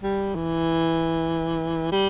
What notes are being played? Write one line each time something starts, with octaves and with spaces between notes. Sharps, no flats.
G3
E3
G3